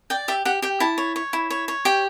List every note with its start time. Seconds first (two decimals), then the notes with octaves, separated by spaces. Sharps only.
0.10 D5 G5
0.28 G4 E5
0.45 G4 F#5
0.62 G4 G5
0.80 E4 A5
0.98 C#5
1.16 C#5
1.33 E4
1.50 C#5
1.68 C#5
1.85 G4 G5